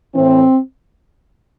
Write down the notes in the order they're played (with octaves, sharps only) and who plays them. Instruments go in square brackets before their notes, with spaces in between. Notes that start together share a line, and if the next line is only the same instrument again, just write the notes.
[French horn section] A2 E3 C4